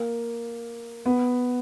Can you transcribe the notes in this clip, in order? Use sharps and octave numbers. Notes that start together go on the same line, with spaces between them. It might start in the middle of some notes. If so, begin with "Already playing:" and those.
Already playing: A#3
B3